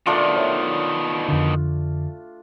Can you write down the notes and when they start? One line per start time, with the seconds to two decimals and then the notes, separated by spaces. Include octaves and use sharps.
0.06 B2 D#3 A3 D4 F4
0.36 C#5 D5 E5
1.29 F2 D3